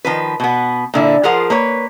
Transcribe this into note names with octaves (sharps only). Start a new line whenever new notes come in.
D#3 F3 B4
B2 B3
A#2 D3 E4
F3 F4 G#4 A#4 F#5
A#3 B4 C#5